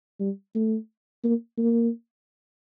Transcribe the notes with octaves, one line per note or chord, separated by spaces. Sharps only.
G3
A3
A#3
A#3